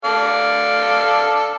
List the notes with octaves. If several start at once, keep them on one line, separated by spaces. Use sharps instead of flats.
A4 D5 F5